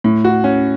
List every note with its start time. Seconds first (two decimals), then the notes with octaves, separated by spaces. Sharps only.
0.04 A2
0.24 F#4
0.44 C#4